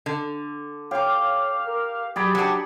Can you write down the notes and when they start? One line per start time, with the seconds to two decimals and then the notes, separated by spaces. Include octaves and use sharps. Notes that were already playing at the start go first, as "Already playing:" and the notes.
0.06 D3
0.91 G4 C#5 F5 D6
1.66 A#4
2.16 F#3 G4 G#4 D5 B5
2.35 F#3 D4 C#7